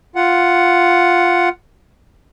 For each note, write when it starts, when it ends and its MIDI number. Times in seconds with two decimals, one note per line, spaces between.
0.16 1.49 65
0.16 1.49 78